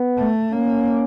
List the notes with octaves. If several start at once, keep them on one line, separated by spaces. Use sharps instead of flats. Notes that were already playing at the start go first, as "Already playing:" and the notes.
Already playing: B3
A3
A#3 C#4